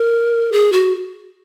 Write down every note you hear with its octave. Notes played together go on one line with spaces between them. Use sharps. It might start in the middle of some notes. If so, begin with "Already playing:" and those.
Already playing: A#4
G#4
F#4